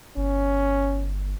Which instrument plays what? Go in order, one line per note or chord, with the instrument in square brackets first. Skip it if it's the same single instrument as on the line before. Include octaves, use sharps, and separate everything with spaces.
[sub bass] G1 [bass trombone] C#4